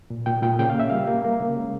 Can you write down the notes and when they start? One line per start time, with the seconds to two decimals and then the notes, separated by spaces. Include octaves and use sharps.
0.10 A#2
0.26 A#2 G5
0.42 A#2 G5
0.59 C#3 G5
0.70 F5
0.75 A#3 E5
0.90 G3 F5
1.07 A#3
1.24 A#3
1.40 C#3
1.57 G#3